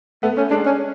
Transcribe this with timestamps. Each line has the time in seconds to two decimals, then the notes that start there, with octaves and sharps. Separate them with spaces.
0.23 A3 B3
0.37 A3 C#4
0.50 G#3 D4
0.65 C#4